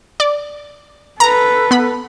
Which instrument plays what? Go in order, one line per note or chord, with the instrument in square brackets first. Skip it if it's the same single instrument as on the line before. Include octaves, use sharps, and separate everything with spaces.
[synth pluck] D5
[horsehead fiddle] A4 B4 [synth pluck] A#5
[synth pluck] B3 B5